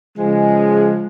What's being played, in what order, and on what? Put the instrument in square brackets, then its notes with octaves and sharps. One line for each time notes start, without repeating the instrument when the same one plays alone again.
[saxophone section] C#3 F3 G#3